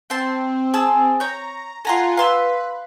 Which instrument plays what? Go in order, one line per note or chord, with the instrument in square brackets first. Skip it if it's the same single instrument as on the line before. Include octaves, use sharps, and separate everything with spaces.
[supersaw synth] C4 [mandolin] G5 A5 C6
[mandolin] G#4 A5 E6
[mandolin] C#5 G6 [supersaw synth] A#5
[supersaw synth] F4 F#5 G#5 [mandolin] A4 A#5 C6
[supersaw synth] B4 [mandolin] F5 C6 E6